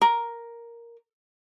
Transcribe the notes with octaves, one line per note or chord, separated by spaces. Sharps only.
A#4